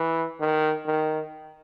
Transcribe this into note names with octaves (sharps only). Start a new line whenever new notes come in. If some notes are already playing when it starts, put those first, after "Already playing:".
Already playing: E3
D#3
D#3